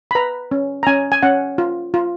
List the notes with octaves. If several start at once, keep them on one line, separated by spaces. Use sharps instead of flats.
B5
B4 A#5
C#4
A#5
C#4 G#5
G#5
C#4 F#5
F4
F4